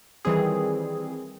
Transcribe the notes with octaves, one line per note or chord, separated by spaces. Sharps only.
D#3 E3 G3 C4 G#4